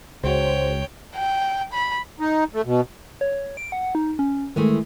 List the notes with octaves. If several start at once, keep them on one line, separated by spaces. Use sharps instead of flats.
C#2 G#3 F#4 C5 C#5 G5
G5
B5
D#4
A3
B2
C#5
D7
F#5
D#4
C#4
D#3 E3 G#3 A3